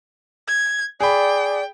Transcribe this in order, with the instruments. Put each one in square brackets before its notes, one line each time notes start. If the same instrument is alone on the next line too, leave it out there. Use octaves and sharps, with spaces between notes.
[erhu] G#6
[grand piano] G#4 B5 [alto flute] D5 [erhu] G5